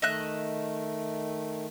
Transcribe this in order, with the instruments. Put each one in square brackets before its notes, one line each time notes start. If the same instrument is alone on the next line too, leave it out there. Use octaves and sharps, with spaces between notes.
[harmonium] D#3 A3 [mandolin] D#5 E5 F#6